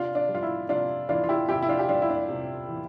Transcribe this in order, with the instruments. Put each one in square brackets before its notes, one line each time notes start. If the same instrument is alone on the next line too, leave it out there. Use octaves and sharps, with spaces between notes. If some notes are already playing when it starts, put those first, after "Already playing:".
Already playing: [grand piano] C3 D4 F4
D4
G3
F4
E4
C3 D4 F4
E3 D4 F4
F4
E4 G4
C3 E4 G4
E4
D4 F4
G4
G3 D4 F4
E4
D4
C3
E3